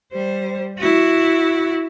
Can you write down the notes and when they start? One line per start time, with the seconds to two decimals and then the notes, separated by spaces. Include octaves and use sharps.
0.12 G3 C5
0.78 E4 F#4